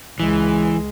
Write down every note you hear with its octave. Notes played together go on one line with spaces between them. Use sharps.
C#2 E3 G#3